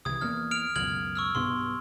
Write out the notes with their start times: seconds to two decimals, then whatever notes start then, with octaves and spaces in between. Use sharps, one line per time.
0.05 C2 E3 D#6 G#6
0.21 E2 A#3 F6
0.51 F6 D7 F7
0.75 C#2 F#2 B2 F6 G#6 F#7
1.16 C#6 E6 F6
1.35 B1 G2 B3 C6